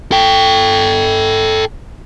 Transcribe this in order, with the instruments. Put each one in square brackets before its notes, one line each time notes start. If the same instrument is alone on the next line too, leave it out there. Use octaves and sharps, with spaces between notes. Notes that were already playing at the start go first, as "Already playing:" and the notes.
[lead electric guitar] A4 G5